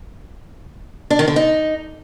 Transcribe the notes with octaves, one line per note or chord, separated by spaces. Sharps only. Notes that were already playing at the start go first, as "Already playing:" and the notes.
D4
D#3
D3
D#4